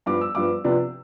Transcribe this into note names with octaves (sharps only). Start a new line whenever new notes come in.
G2 F3 B3 D6
E6
G2 F3 B3 D6
C3 F3 B3 D4